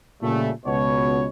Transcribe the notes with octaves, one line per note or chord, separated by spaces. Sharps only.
A#2 C#3 G3 A3
C#2 B2 C#5